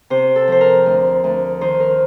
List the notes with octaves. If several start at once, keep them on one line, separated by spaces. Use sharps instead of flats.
C3 C5
A4
F3 C5
A#4
D2
D2
D#3 C5
A#4